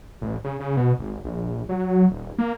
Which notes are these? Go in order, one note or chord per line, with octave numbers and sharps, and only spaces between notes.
A1
C#3
C#3
B2
G#1
A#1
F#3
D#1
A#3